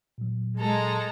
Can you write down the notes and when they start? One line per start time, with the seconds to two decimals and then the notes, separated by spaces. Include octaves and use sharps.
0.18 A#2 F#3
0.59 G#3 A4 A#5